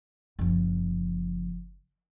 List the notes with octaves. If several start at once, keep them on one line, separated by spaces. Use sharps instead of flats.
F#1 F3